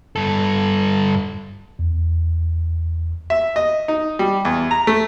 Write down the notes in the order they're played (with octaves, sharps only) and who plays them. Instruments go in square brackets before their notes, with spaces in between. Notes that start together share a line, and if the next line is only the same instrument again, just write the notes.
[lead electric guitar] G2 A4
[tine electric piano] E2
[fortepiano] E5
D#5
D#4
G3
E2
A#5
A3